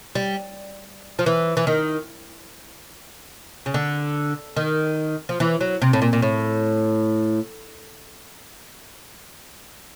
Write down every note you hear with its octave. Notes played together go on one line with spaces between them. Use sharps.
G3
F3
E3
E3
D#3
C#3
D3
D#3
F3
E3
F#3
C3
A2
A#2
A#2
A2